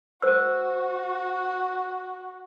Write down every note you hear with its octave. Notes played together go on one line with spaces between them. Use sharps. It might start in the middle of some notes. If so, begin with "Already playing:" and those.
F#4 C5 E6